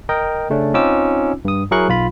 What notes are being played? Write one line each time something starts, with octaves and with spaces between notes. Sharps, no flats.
A#4 D#5 G5
C#3 A3 C#4 D4
C4 C#4 D#4 F4 D6 E6
G2 D#6
F#3 E4 G#4 A#4 C#6 F#6
B1 F4 B5